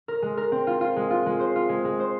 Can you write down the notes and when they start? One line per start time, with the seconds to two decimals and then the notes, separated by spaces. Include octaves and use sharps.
0.08 A#4
0.22 G#3
0.37 A#4
0.52 C4
0.67 F4
0.81 F4
0.96 G#3
1.10 F4
1.26 G#3
1.40 C5
1.56 F4
1.69 G#3
1.85 G#3
2.00 C5